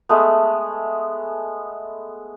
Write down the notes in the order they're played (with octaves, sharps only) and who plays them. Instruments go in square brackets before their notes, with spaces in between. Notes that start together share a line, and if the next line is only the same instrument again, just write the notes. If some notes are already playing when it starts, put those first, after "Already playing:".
[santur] G#3 A3 B3